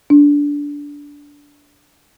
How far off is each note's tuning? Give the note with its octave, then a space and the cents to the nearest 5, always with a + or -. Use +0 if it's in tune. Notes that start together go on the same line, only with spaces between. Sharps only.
D4 -15